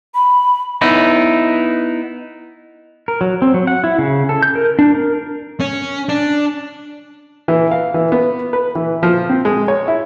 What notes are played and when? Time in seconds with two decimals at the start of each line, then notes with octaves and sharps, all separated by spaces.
0.15 B5
0.81 B3 D#4 E4
3.08 A#4
3.21 F#3
3.42 C4
3.54 F#3
3.67 F#5
3.84 E4
3.99 C#3
4.29 A4
4.43 G6
4.55 A#4
4.79 D4
4.94 A#4
5.60 C#4
6.09 D4
7.48 E3
7.71 F5
7.94 E3
8.12 B3
8.53 B4
8.75 E3
9.03 F3
9.29 C4
9.45 G#3
9.68 C#5
9.88 E4